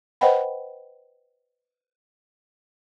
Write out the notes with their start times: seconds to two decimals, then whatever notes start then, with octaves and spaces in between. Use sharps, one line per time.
0.21 B4 C5 D#5 F#5 G5 B5